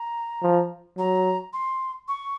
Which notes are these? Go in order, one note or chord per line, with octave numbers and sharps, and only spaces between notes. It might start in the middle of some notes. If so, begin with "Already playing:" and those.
Already playing: A#5
F3
F#3 A#5
C6
C#6